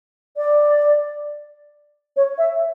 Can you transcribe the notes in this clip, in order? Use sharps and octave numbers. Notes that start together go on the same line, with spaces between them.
D5
C#5
E5